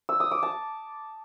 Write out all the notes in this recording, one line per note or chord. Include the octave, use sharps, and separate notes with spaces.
E6
D#6
D6
A5